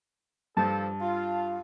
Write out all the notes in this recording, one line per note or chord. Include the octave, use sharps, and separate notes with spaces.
G2 F3 A4 A5
F4 F5